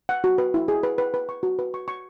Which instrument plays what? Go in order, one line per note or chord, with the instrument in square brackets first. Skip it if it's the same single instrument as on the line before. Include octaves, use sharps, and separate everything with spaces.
[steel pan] F#5
F#4
B4
E4
G#4
B4
B4
B4
C#6
F#4
B4
C#6
C#6